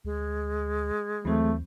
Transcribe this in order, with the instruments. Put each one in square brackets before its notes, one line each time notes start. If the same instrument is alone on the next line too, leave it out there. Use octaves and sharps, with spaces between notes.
[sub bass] D2 [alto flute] G#3
[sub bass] D#2 [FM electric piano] E3 F#3 C4 [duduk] A3